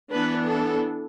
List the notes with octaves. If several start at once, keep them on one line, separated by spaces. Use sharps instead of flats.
E3 B3 D4 B4
A4